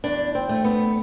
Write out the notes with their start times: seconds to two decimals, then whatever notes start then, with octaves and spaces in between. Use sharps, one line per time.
0.04 E2 D4
0.35 C4
0.49 A3
0.64 B3